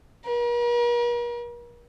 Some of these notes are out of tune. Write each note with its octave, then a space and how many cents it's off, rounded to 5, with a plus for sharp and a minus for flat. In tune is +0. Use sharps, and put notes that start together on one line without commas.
A#4 +45